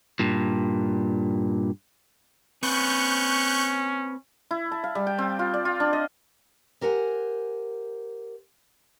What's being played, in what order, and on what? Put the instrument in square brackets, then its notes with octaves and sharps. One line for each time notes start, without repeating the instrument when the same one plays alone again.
[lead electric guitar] G2 A#2
[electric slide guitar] C4 B4 [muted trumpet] C#4 [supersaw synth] C#6 F#6 G6
[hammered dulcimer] E4
A5
F5
G3
G5
C4
F4
D5
F4
D4
D#5
[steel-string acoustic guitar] G4 A#4 C5 F#5 G#5